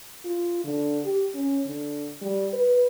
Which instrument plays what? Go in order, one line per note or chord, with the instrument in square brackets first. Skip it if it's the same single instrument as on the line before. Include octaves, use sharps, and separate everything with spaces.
[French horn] F4
D3
G4
C#4
D3
G3
B4